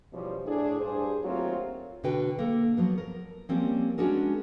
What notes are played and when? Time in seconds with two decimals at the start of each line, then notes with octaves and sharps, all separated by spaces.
0.13 E2 B2 F3 G3 C#4
0.46 A2 D4 G#4
0.80 G2 G#4 C5
1.23 D#2 F#3 A3 C4 F4 A#4
2.04 B2 D3 F#4 B4 G5
2.39 A#3 A4
2.77 F3 F#3 B3
2.98 A#4
3.49 F3 G3 A#3 C4 C#4
3.98 G#3 C#4 D4 F#4 G#4 A#4